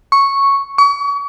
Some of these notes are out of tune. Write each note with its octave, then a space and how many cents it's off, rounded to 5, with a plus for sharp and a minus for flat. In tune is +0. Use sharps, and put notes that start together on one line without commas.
C#6 -5
C#6 +35